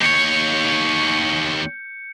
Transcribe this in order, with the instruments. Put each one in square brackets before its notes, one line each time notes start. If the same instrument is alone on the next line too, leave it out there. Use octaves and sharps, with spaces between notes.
[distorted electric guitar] D#2 C#5 [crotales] G6 C#7